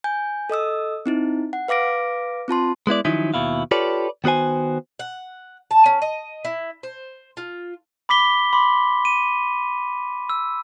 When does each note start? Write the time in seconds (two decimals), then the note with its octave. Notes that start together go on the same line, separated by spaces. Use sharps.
0.04 G#5 G6
0.50 A4 D#5 D#6 E6
1.06 C4 D#4 E4
1.53 F#5
1.68 B4 F5 D6 A#6 D7
2.48 C4 F4 A5 C6
2.87 G#3 B3 E4 D5
3.05 D#3 F3 F#3 C#4 D#4 E4
3.34 D#2 B2 E4 F5
3.71 F4 G4 A4 B4 C#5 D5
4.24 D#3 B3 F#4 C5 G#5
4.99 F#5
5.71 A5
5.86 C#4
6.02 D#5
6.45 E4
6.83 C5
7.37 F4
8.09 B5 D6 B6 G7
8.53 B5 C6 D6
9.05 D#7
10.30 E6